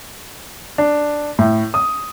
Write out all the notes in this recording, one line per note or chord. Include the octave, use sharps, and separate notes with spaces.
D4
A2
D#6